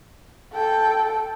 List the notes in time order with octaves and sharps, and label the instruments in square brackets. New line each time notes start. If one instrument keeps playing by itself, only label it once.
[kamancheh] A4 G5